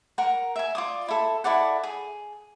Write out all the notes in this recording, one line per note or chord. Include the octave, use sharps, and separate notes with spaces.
A#4 F#5 A#5
E5 G#5
F4 D5 D#6
E4 A4
E4 A4 D5 F#5
G#4